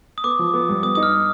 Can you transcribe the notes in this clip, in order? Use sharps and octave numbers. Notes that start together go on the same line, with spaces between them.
D#6
B3 D6
F3
B3
G2
B3 D#6
D#4 D#6
F6